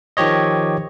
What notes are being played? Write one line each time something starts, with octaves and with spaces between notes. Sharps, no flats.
D#3 F3 G4 C#5 D#5